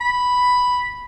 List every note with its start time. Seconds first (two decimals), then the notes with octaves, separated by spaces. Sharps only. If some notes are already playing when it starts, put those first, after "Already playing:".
0.01 B5